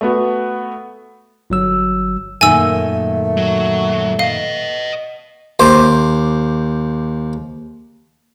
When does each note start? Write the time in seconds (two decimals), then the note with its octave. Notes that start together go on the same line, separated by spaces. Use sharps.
0.01 A3 B3 F#4
1.50 G1 F#3 E6
2.41 F#2 A#2 D#3 A3 G#5 E6
3.37 F#3
4.19 B4 D#5 F5
5.60 D#2 C5 D6